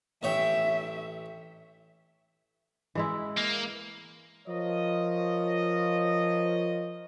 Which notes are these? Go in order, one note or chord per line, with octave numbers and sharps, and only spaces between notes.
A1 C#5 E5 G5
E3 G#3 E4
A#3
F3 F4 A#4 C#5 D#5